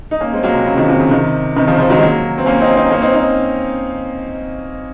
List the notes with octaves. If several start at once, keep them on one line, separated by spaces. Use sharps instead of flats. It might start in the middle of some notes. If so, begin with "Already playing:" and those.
D#4
A#3 C#4
G#3 C4
F#3 A#3
C3
C#3
C3 D#3
C3 D#3
C#3
C3 D#3
C3 D#3
C#3 F3
C#3 F3
D#3 F#3
G#3
F#3 A#3
C4
A#3 C#4
C4 D#4
C4 D#4
A#3 C#4
C4 D#4
C4 D#4